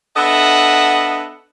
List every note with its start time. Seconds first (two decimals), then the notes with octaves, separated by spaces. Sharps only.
0.17 B3 D4 A4 D#5 E5 F#5